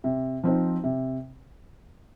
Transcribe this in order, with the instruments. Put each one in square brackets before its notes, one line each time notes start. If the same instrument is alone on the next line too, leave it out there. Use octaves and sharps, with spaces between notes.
[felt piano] C3
F3 C4 D#4 C5
C3